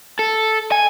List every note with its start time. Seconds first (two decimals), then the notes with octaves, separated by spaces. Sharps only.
0.19 A4
0.72 G#5